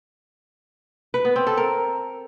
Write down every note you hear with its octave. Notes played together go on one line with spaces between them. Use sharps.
B4
B3
C4
A4
A#4